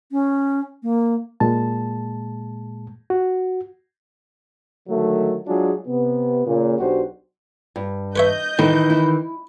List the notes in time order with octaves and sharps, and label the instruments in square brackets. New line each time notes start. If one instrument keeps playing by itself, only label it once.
[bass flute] C#4
A#3
[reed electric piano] A#2 G#3 A5
F#4
[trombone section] D3 D#3 F#3 G#3 A3
F#3 G#3 D4 F4 F#4 G#4
C3 B3
A#2 C#3
B1 D4 F#4 G4 C5
[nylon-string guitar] G2
[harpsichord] B4 C#5 E5 [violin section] D#5 G6
[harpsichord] A2 [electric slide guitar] D#3 E3 [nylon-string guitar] E4
[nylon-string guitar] E4